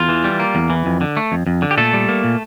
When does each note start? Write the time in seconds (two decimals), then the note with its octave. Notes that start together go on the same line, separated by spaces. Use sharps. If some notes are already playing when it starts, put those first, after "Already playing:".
Already playing: E2 F4
0.09 E3
0.24 G3
0.40 A#3
0.55 E2
0.70 E3
0.86 F2
1.01 D3
1.17 A3
1.32 F2
1.47 F2
1.62 D3
1.71 G4
1.77 A#2 A3 A4
1.93 G3
2.09 A#3
2.24 A#2